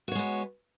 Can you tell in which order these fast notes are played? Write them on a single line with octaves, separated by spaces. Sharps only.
F#4 C#5 G#3 B3